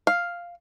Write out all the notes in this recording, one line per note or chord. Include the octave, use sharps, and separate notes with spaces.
F5